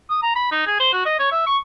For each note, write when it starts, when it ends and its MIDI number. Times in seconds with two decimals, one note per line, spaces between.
0.10 0.21 87
0.22 0.33 82
0.36 0.50 83
0.51 0.65 63
0.67 0.79 68
0.80 0.90 72
0.93 1.05 66
1.05 1.15 75
1.19 1.27 73
1.32 1.43 76
1.46 1.57 85